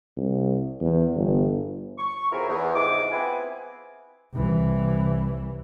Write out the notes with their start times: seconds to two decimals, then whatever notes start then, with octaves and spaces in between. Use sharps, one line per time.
0.17 C2
0.80 E2
1.15 G1
1.98 C#6
2.31 F2 C#3 F#3 E4 G#4 A#4
2.48 E2
2.76 F2 G#2 C3 G#3 D6
3.11 B3 C4 E4 F4 B4 G#5
4.34 C2 E3